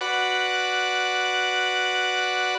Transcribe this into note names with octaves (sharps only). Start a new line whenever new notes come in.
F#4 B4 D5 F#5